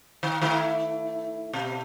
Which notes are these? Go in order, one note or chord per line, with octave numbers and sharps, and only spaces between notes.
D#3
D#3 A3 E4
B2